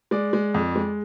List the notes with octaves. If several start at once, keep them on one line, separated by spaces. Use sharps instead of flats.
G#3 D5
G#3
F2
G#3